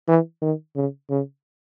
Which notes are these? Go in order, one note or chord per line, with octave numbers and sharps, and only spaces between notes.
E3
D#3
C#3
C#3